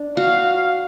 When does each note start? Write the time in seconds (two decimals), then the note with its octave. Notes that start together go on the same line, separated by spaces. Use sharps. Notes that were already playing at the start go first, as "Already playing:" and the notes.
Already playing: D4
0.17 F#4 F5